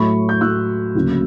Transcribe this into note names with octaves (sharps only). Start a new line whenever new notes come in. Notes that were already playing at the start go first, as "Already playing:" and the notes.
Already playing: A2 F#3 A3 B5 C#6
G6
A2 F#3 A3 E6 F#6
D2 C#3 F#3 A#3